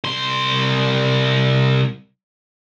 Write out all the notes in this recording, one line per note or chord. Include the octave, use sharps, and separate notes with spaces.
C2 C6